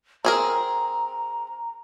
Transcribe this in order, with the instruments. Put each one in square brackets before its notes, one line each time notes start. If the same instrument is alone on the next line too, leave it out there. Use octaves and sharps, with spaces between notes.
[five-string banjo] C4 G#4 A#4 [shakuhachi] A#5